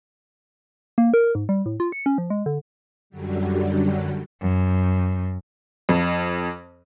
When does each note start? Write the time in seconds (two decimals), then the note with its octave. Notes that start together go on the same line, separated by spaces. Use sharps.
0.98 A#3
1.14 A#4
1.35 G#2
1.49 G3
1.66 A2
1.80 F4
1.92 C#7
2.06 C#4
2.18 F3
2.30 G#3
2.46 D3
3.10 F#2 D3 F#3 G3
4.41 F#2
5.89 F2